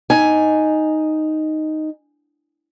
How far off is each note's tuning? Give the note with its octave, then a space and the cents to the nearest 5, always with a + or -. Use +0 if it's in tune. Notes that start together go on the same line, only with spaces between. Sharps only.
D#4 +0 G#5 +0